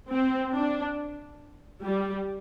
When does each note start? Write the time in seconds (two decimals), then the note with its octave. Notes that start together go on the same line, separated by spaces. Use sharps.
0.10 C4
0.54 D4
1.83 G3